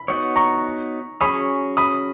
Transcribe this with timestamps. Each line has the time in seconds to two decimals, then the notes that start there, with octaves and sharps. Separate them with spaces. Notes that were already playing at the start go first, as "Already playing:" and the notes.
Already playing: B5
0.08 B3 D#4 F#4 C#5
0.36 A#5 C#6
1.21 F#3 C#4 G#4 C#5 B5 D#6
1.77 B5 D#6